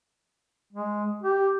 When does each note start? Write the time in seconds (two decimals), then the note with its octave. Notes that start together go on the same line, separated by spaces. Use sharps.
0.73 G#3
1.22 G4